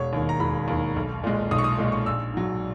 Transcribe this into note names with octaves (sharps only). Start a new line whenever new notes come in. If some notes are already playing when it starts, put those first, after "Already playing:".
Already playing: E1 C#5
D#2 D#3
A#5
E1 B5
D#2 D#3
B1
A#2 G#3
B1 D#6
C#6
D#6
A#2 G#3
C#6
A#1 E6
G#2 F#3